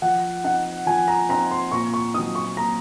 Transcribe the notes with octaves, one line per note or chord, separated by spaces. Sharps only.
F3 F#5
C4 D#4 F#5
F3 G#5
A#5
C4 D#4 A#5
C6
A#2 C#6
C#6
F#3 C4 D#4 D#6
C#6
A#2 A#5